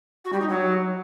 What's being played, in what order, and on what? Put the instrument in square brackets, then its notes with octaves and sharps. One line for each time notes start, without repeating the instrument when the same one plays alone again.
[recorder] F#4
G3
D#4
F#3